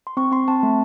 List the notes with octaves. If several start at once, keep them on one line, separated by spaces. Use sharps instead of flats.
C6
C4 C#6
C4 C6
C4 A5
A3